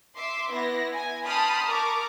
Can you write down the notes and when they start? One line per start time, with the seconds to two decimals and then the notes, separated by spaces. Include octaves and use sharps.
0.16 E5 C6 D6
0.51 B3 E4 A#6
0.94 G#5
1.25 G5 A5 B5 C6 D#6 F6
1.66 A#4 A#5 C#6 D6